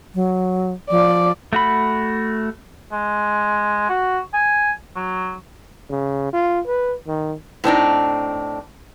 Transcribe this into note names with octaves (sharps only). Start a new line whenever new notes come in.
F#3
F3 D5
A3 F#4 B5
G#3
F#4
G#5
F#3
C#3
F4
B4
D#3
A2 C4 D4 D#4